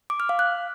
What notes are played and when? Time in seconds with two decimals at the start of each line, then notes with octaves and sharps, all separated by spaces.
0.10 D6
0.20 F6
0.29 F5
0.39 F#6